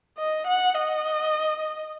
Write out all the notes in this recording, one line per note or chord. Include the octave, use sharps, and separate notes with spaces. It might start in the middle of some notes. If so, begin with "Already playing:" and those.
D#5
F#5
D#5